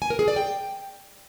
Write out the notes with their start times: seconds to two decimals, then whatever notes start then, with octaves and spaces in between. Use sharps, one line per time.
0.02 G#5
0.10 A#4
0.19 G#4
0.28 D5
0.36 G5